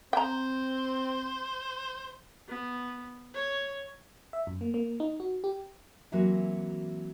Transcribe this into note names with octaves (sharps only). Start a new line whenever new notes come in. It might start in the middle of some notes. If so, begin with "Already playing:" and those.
C4 C5 G5 A#5
B3
C#5
E5
F#2
A#3
A#3
D#4
F#4
G4
E3 F#3 A#3 C4 F#4